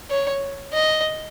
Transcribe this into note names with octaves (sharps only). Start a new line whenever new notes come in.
C#5
D#5